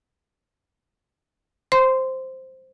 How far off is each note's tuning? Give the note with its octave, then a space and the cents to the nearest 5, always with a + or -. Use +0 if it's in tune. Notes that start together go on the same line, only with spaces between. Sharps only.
C5 +0 C6 -15